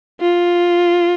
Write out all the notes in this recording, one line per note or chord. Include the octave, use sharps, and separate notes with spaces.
F4